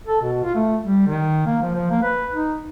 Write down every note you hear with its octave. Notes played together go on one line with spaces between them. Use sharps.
A4
B2
F4
A3
G3
D#3
A#3
F3
F3
A#3
B4
D#4